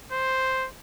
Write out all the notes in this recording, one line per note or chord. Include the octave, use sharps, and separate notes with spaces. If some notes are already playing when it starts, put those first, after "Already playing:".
C5